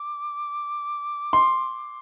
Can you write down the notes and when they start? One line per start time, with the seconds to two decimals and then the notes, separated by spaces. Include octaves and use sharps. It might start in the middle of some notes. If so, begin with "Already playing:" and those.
Already playing: D6
1.33 C6